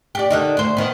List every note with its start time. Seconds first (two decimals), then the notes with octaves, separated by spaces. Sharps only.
0.15 G4 D5
0.31 D3 D#3 D#4
0.57 D2 C5
0.77 D#3 B3